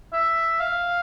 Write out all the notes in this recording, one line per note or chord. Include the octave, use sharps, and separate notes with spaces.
E5
F5